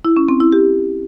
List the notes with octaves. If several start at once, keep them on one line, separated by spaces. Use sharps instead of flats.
E4
C#4
C4
E4
G4